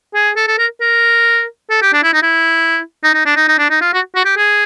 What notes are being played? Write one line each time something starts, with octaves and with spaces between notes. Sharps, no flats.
G#4
A4
A4
A#4
A#4
A4
G4
D4
E4
D#4
E4
D#4
D#4
D4
D#4
D#4
D4
D#4
F4
F#4
F#4
G4
G#4